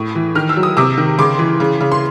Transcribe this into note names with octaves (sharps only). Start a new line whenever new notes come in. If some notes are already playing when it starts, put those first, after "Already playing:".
Already playing: A2 C#6 D#6
E3
D#3 F6
E6
F#3
D#6
C3 D6 E6
D#3
C#3 C6 D6
E3
C#3
C#3
C6